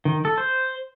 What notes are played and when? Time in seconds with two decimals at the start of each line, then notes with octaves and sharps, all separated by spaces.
0.05 D#3
0.25 A4
0.38 C5